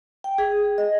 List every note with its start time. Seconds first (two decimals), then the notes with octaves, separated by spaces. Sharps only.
0.24 G5
0.38 G#4
0.78 D#5